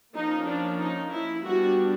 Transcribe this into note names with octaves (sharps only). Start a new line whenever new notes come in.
F3 A#3 C#4 D#4
D4
D#4
E4
G3 B3 D4 F#4